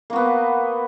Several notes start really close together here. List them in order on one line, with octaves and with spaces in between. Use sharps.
A#3 F#4 B3